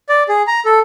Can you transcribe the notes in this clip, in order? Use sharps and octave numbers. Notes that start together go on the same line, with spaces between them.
D5
G#4
A#5
A4